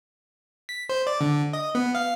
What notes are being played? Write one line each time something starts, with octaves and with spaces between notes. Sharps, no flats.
B6
C5
D5
D3
D#5
B3
F5